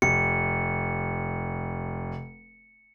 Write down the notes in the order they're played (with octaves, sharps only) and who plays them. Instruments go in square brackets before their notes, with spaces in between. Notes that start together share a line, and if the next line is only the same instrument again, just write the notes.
[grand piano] F1 [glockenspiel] C#7